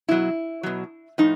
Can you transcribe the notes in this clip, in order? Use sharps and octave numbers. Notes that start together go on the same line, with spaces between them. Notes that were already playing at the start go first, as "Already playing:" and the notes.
B2 F#3 E4
B2 F#3
A2 F3 D#4